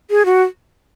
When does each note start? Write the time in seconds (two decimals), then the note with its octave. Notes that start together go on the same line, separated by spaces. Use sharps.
0.10 G#4
0.26 F#4